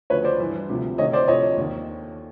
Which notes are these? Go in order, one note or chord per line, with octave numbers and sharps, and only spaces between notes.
D2 C#3 F3 B4 C#5
C5 D5
G2 E3
D2 C3 F3
D2 C3 D#3 C#5 D#5
C5 D5
D2 C3 F3 C#5 D#5
D#2 D#3